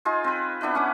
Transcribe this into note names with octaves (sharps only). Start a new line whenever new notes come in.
D#4 F4 G#4 C5
C4 B4
B3 D4 E4 B4
C#4 F#5 D6